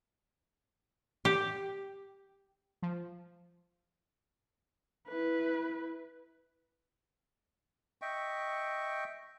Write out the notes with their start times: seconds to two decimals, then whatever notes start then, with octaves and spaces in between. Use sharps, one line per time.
1.25 G4
2.82 F3
5.08 E4 B4
8.02 D#5 E5 G5 C#6